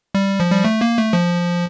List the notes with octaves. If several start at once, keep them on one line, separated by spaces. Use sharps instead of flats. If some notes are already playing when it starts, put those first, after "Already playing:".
G3
F3
G3
A3
A#3
A3
F3